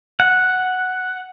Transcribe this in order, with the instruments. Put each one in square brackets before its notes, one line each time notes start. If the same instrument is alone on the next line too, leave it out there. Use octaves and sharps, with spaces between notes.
[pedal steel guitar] F#5